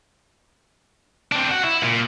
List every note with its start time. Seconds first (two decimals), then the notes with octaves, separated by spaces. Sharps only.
1.32 C4 D4
1.51 F#4
1.64 E4
1.83 A#2